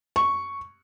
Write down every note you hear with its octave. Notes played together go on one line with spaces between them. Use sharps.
C#6